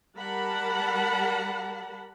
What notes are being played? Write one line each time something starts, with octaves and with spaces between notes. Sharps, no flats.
G3 A#4 F#5 A5 B5